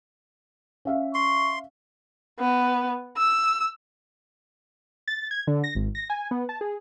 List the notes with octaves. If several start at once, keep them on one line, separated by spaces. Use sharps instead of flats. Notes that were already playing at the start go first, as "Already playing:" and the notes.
C#4 E5 F5
C6 C#6
B3
E6
A6
G#6
D3
A#6
G#1
A#6
G#5
B3
A5
G#4